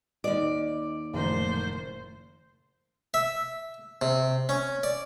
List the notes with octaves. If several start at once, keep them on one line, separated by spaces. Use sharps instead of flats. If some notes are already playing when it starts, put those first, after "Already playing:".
D#2 D5 D#5
F#1 A#2 D#3 F3 A3 A#4 C5
E5
C3
C#4
D5